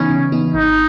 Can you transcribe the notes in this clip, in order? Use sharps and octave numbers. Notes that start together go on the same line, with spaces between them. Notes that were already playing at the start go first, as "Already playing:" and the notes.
Already playing: C#3 E3 B3 C#4 D#4
C#3
E3 B3 D#4
G#1 D#4